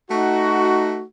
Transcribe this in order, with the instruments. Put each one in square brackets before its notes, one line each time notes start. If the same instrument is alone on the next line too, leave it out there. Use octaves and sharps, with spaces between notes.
[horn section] A3 D#4 F#4